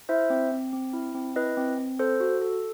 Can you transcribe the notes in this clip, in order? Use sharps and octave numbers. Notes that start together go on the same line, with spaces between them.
E4 C5 E5
C4
C4
C4
E4
C4
E4 B4 D#5
C4
C4
A4 C5
F#4
A4